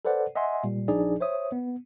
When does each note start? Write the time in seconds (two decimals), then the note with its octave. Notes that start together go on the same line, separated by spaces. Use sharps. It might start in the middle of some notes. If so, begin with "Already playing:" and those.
0.05 A4 B4 C5 D5 F#5
0.35 D#5 E5 F#5 G#5 C6
0.64 A#2 G3
0.88 A#1 F3 D4 D#4 G#4 D5
1.21 C5 C#5 E5 D#6
1.52 B3